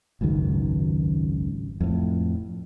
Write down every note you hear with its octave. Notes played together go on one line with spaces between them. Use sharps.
G#1 C#2 F#2 D#3
F2 A2